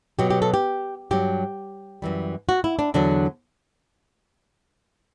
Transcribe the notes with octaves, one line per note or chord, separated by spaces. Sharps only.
B2 F#3 G4
G4
A4
G4
G2 F#3 G4
F#2 E3 G3
F#4
E4
D4
E2 D3 F#3 D4